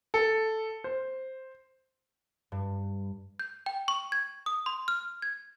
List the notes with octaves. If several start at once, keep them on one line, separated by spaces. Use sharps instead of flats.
A4
C5
G2
G6
G5
C#6
G#6
D#6
C6
F6
G#6